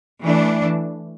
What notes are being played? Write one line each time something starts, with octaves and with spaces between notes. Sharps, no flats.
E3 A3 D4